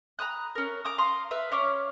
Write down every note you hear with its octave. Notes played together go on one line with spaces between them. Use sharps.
A#5 B5 D#6 F#6
C#4 A#4
A#5 D6 D#6
F5 A#5 C6 D#6
B4 E5 F5
C#4 C#5 F5 D6